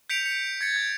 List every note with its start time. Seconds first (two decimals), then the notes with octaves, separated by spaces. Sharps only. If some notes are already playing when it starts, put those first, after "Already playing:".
0.09 G6 B6 C#7 D7 F7
0.26 C#7
0.61 G#6 A6 C#7
0.76 G6